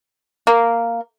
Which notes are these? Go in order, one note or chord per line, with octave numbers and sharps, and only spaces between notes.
A#3